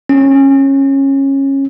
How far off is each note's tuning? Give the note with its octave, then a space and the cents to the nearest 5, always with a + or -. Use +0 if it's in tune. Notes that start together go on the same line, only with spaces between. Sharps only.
C#4 -20